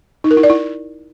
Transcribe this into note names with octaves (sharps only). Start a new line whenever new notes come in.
D#4
A#4
E4
D5
E4